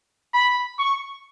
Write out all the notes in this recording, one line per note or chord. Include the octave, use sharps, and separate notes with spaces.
B5
C#6